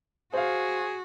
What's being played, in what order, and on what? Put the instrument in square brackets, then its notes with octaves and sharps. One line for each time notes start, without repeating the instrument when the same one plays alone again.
[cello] F#4 [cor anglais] G#4 [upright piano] C5 F5